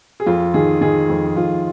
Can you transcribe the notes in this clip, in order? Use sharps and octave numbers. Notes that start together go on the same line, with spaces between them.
G#4
F2 F4
D#3 G#4
D#3 G#4
F2
F2 F4